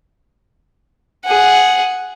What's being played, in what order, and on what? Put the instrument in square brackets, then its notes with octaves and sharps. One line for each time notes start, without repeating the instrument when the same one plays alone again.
[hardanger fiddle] G#4 F#5